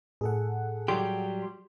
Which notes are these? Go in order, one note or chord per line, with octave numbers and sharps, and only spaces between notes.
A2 G#4 A4 F#5
F#3 G3 G4 C6